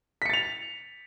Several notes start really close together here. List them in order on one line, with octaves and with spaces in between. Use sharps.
B6 C#7 A6 F7